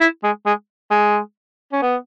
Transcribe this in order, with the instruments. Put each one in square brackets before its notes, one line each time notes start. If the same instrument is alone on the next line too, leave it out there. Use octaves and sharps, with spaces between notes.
[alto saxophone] E4
G#3
G#3
G#3
C#4
B3